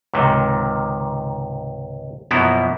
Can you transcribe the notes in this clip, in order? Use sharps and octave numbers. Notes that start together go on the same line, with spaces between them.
C#2 G#2 C3 D#3
F#2 B2 F3 A#3 B3 E4